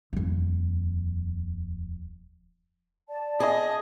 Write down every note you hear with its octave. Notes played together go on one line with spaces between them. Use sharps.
D#1 F2
D5 A5
G#4 D#5